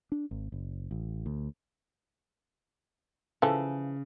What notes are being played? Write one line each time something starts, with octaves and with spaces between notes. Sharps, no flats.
D4
G#1
F#1
A1
D2
C#3 E3 F3 A4